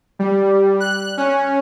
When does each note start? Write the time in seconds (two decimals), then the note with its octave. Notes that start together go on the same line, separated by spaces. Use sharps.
0.19 G3
0.80 F#6
1.17 C#4